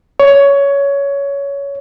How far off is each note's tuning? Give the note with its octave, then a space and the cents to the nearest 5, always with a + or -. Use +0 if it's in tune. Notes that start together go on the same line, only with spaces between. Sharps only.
C#5 +15